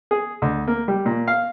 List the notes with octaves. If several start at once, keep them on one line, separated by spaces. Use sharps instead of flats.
G#4
D2
A#3
G3
A#2
F5